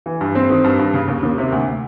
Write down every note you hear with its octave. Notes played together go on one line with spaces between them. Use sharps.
E3
G2
C4
D#3
G2
G2
C#3
D#2
D#2
C3
D2